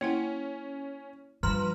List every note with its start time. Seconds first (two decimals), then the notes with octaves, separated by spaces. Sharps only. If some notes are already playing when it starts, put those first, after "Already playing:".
0.01 A#3 C#4 E4 F#5
1.43 G2 F3 B4 A#5